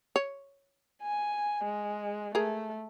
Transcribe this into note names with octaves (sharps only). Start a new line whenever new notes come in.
C#5
G#5
G#3
A3 G#4 A#4